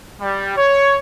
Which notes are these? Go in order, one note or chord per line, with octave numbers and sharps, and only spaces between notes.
G3
C#5